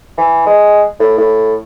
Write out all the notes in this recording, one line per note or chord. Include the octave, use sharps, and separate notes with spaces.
E3
G#3
A2
A2